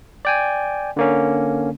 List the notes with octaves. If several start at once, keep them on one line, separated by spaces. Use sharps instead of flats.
D5 G5 G#5
D3 A#3 C#4